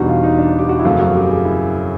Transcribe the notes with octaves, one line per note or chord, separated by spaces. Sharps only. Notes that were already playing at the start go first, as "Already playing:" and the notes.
Already playing: E2 B2 G3 D4 D#4 F#4
F4
D#4
D4
G4
F#4
E4
F#2 C#3 F3 A3 C4 F4
F#4
G4
G#4
E4